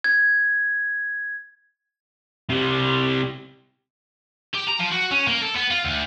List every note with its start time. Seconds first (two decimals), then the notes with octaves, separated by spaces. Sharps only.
0.04 G#6
2.49 C3 G3
4.54 G4
4.68 A#5
4.79 F3
4.91 F#4
5.11 C#4
5.28 A#3
5.42 A4
5.56 B3
5.71 F4
5.84 D2